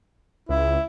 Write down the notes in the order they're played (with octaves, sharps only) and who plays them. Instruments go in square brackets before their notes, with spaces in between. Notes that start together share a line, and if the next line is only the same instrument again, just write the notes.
[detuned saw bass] C#2 [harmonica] E4